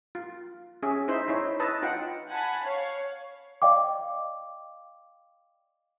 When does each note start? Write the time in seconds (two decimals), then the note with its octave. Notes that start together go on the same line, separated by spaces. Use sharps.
0.15 F4
0.83 C#4 G#4 E5
1.08 D#4 E4 C5 E5
1.28 D#4 E4 C#5
1.60 B4 D#5 A5 A#5 E6
1.82 D#4 F4 F#5 G5
2.31 F#5 G#5 A5 B5
2.64 C#5 F5
3.62 D5 D#5 F5 G5 D6